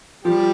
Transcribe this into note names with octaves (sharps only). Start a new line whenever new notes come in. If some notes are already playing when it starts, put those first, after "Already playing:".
F3 G3 G4